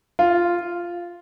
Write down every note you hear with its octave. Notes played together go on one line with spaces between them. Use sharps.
F4